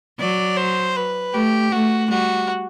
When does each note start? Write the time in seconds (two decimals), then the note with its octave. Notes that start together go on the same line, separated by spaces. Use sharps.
0.20 F#3 D5
0.57 C5
0.96 B4
1.33 A3 G4
1.72 A3 F#4
2.09 G3 F#4